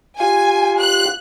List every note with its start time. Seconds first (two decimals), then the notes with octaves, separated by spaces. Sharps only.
0.20 F4 G4 F5 G#5
0.80 F#6